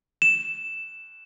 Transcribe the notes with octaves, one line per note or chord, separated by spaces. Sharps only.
E7